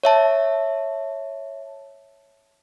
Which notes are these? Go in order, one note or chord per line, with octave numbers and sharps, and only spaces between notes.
C#5 E5 A5